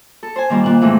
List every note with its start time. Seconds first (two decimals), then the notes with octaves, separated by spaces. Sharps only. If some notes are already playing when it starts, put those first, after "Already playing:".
0.23 A4
0.36 C5 G#5
0.50 A#2 D#3 G3 C5
0.64 A#2 F#6
0.81 G#2 E3 A3 C4